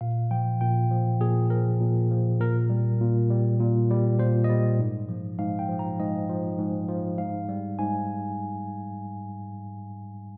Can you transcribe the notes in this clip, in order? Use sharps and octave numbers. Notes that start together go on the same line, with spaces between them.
A#2 F5
F3 G5
A#2 G5
F3
A#2 G#4
F3 A#4
A#2
F3
A#2 A#4
G3
A#2
G3
A#2
G3
A#2 C5
D#5
G3 D5
G#2
F3
G#2 F5
G5
F3
A#5
G#2 D#5
F3
G#2
F3
G#2 F5
G3
G#2 G#5